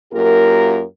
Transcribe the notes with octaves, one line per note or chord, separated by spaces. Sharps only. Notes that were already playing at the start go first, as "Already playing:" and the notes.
F#2 A#3 F4 G4 A#4